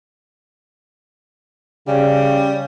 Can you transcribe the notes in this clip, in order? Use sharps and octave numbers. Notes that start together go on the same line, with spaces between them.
C#3 G3 C#4